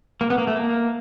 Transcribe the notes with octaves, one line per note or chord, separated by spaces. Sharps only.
A#3
B3
A#3
A3
A#3